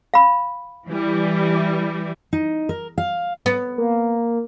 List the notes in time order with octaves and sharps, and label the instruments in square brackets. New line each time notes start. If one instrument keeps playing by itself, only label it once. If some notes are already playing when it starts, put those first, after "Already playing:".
[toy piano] F5 B5
[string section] E3 G3
[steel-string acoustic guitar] D#4
A#4
F5
[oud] B3
[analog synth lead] A#3